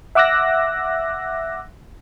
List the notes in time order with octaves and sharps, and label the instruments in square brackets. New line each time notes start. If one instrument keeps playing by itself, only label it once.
[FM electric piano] E5 F#5 D6 E6 F#6 A#6